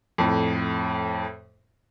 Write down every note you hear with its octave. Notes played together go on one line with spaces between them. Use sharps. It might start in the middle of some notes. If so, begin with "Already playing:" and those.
F2 A2